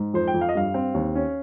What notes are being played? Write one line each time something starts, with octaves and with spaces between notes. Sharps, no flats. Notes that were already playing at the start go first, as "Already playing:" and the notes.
Already playing: G#2
F2 C5
G5
F2
F5
D#5
G2 F5
C4
D#2
C#4